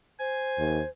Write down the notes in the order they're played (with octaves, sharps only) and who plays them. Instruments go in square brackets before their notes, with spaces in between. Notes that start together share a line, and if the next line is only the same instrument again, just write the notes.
[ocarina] C5 [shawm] G#5
[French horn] D#2